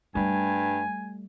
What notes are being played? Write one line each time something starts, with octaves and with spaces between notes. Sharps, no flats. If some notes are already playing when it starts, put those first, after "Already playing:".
G2 G3 A3 G#5